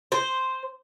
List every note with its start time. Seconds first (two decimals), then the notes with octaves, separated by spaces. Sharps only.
0.12 C5